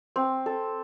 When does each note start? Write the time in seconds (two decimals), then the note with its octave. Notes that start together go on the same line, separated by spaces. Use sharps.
0.16 C4
0.46 A4